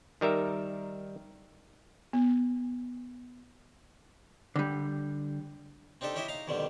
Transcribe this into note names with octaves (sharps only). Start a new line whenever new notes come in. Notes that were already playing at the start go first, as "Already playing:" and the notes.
D#3 G3 A#4 E5
B3
D3 G3
C4 D4 D#4 G4 A4
C#4 E4 G4 D#5 E5
D#4 F5 A#5
F2 B2 D3 D#3 G3